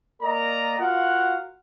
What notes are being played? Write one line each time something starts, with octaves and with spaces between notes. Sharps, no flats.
A#3 A#4 D5 D#5 A#5
F4 F#4 A#4 F5 F#5